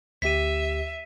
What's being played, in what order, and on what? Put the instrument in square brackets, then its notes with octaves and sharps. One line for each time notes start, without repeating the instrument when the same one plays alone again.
[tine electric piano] D2 G4 [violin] E5 [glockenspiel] B6 D#7